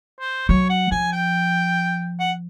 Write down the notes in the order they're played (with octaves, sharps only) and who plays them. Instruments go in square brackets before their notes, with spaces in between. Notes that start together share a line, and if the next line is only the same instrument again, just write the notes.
[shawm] C5
[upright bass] F#3 [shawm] C#5
[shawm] F#5
[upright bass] F3 [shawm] G#5
[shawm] G5
F#5